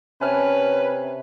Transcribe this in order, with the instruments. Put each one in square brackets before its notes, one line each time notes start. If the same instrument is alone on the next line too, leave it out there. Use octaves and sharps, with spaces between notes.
[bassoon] C3 [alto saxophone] C#4 [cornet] B4 [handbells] G#5 A5 F6